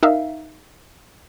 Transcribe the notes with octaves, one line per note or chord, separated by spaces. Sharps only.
D#4 A#4 E5 F5